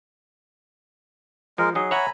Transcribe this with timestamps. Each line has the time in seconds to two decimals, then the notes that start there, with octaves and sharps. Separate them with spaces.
1.58 F3 G#3 A#4
1.75 F#3 D#4 G#4
1.91 C#5 E5 F#5 G#5 A#5 B5